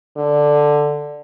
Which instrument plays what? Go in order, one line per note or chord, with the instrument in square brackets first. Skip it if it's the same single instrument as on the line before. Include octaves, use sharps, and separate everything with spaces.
[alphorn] D3